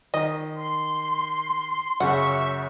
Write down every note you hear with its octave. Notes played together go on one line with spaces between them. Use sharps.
D#3 D#5
C6
F#2 C#3 E5 F#5 C#6